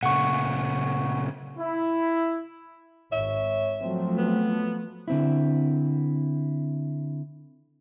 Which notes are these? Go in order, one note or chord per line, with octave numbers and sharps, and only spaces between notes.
A#2 C#3 A3 F#5 C#6
E4
G#1 C#5 E5
F3 F#3 A3 C4
B3
D3 C4 E4